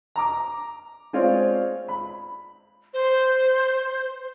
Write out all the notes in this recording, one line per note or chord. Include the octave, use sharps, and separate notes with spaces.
A#5 D6
G#3 C4 F4 C#5 D5
B5
C5